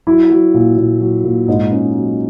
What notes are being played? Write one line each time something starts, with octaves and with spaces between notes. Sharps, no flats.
F#3 E4
F#3
A#2
A#2
F#3
A#2
G#2 D#4
G#2 C#4
F#3